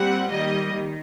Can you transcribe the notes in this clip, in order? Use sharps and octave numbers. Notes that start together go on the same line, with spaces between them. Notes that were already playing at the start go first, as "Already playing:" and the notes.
Already playing: A#2 G3 C4 F#5
D#3 G3 A#3 D#5
D#3